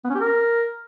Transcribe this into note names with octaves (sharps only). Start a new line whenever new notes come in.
B3
C#4
G4
A#4